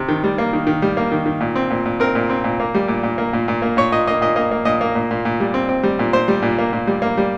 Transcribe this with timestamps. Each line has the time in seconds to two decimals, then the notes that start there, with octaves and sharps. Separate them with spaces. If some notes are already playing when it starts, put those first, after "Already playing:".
Already playing: C3
0.09 D#3
0.24 G3
0.38 A#3
0.53 D#3
0.67 D#3
0.82 G3
0.97 A#3
1.12 D#3
1.26 D#3
1.41 A#2
1.56 C4
1.70 A#2
1.86 A#2
2.00 C4 A#4
2.15 A#2
2.29 C4
2.44 A#2
2.60 A#3
2.74 G3
2.88 A#2
3.03 A#2
3.18 A#3
3.33 A#2
3.48 A#2
3.62 A#3
3.77 A#2 C#5
3.92 A#2 D#5
4.07 A#3 D#5
4.21 A#2 D#5
4.36 A#3 D#5
4.51 A#3
4.65 A#2 D#5
4.81 A#3
4.95 A#2
5.11 A#2
5.25 A#2
5.40 G3
5.54 C4
5.69 C4
5.83 G3
5.99 A#2
6.13 A#2 C5
6.28 G3
6.42 A#2
6.58 A#3
6.73 A#2
6.87 G3
7.02 A#3
7.17 G3